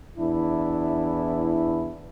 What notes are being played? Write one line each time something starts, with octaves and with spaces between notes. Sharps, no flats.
E2 D4 E4